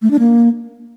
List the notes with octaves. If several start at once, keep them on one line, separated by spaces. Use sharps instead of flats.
A3
D4
A#3